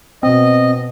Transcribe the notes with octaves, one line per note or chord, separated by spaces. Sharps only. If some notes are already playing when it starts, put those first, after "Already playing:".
B2 C4 D#5